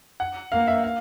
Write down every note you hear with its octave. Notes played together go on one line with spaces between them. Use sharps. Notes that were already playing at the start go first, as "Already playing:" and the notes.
F#5
A#3 F5
E5
F5